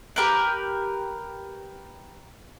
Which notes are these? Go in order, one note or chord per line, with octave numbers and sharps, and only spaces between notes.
G4 A#4 B4